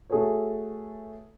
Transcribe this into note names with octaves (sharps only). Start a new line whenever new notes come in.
A3 F#4 G#4 A4 B4 C#5